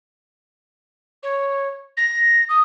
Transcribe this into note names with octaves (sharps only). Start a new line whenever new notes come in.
C#5
A#6
D#6